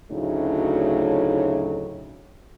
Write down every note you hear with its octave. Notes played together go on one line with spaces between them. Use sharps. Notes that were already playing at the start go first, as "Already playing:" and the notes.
D2 A2 C#3 F#3 A3 D#4